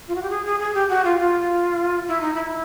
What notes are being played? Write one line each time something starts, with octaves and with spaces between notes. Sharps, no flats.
F4
F#4
G4
G#4
G#4
G#4
G4
F#4
F4
F4
E4
D#4
E4